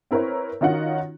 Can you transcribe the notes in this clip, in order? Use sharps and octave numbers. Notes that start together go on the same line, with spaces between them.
C4 E4 A#4 B4 C#5
D#3 C#4 D#4 F4 F#4 F#5